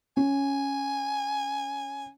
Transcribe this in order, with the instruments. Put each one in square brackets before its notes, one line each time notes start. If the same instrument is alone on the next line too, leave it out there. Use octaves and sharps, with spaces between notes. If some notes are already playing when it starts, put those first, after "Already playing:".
[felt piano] C#4 [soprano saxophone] G#5